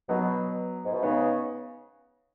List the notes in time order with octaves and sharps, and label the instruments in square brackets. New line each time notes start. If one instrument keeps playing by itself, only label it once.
[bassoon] B2 [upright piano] F#3 B3
[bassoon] G#2
B2
[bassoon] C#3 [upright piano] B3 D#4